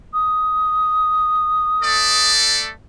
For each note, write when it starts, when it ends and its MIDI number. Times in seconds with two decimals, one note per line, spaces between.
0.14 2.31 87
1.83 2.71 57
1.83 2.71 69
1.83 2.71 74